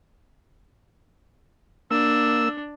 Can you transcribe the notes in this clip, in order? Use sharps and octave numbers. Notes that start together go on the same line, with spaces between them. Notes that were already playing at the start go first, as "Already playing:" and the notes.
A#3 D4 E6